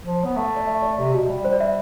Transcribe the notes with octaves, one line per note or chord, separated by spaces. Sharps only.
F3
B3
A3
D5
E5
D5
C3 D5
B2
G3
C5
D5
E5